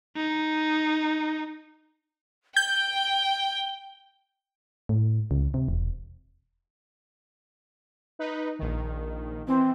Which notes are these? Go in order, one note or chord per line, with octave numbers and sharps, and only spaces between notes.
D#4
G5 G6 G7
A2
C#2
C3
E1
D#4 B4
A#1 D#3
E3 C4